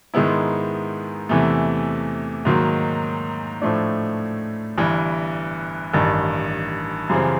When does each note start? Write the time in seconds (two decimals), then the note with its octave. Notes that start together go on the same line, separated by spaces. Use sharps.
0.14 G#2 D#3 G#3 B3 E4
1.29 E2 C3 E3 A3
2.45 G#2 D#3 F#3 A#3
3.61 A2 F3 A3 D4
4.78 G1 G2 E3
5.94 A1 G2 D#3
7.09 F#2 C#3 E3 G3 C4